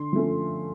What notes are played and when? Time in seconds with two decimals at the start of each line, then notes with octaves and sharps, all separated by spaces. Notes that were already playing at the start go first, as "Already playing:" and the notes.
Already playing: D3 C6
0.13 F3 A3 C#4